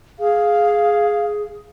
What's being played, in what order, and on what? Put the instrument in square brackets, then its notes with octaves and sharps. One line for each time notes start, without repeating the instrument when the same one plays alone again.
[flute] G#4 [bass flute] F5